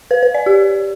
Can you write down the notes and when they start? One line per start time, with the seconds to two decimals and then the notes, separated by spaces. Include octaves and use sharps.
0.11 B4
0.23 B4
0.34 D5
0.46 G4